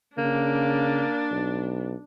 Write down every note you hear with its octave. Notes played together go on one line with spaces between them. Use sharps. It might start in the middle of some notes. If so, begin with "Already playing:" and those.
C#3 A#3 D4
B1